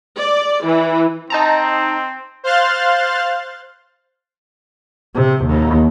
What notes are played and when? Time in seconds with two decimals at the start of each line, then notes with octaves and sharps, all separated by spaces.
0.19 D5
0.65 E3
1.30 C4 D#4 A5 A#5
2.43 C5 F5 C6 F6 F#6 A6
5.15 C3
5.45 D#2